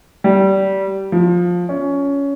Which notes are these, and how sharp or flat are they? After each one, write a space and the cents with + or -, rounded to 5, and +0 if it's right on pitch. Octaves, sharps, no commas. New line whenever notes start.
G3 -20
F3 +15
C#4 +15